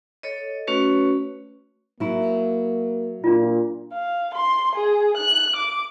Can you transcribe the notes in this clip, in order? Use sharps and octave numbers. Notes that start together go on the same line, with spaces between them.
A4 C#5 D#5
A3 C#4 F#4 B4 C#5
F#3 A#3 E4
A#2 D4 F4
F5
C6
G#4
F#6
D6